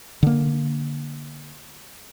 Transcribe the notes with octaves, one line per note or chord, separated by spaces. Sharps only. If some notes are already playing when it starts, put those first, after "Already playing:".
D3 A#3